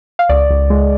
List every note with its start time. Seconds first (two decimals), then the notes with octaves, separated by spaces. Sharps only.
0.19 F5
0.29 C#2 D5
0.50 C#2
0.70 G#3